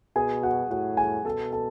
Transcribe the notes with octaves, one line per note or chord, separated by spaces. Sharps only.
B2 G#4 G#5
F#4 F#5
A2 F#4 F#5
G#4 G#5
B2 A4 A5
A4 A5